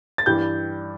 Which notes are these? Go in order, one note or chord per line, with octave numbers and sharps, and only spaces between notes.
A6
G2 E3 G3 G6